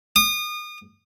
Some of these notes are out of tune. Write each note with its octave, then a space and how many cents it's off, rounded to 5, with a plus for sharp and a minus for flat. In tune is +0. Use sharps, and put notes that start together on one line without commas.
D#6 -35